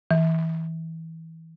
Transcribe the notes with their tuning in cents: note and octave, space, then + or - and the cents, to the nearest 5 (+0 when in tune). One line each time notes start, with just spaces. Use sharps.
E3 -25